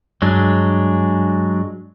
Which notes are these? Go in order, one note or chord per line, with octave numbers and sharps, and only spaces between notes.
G2 F#3 G#3 D4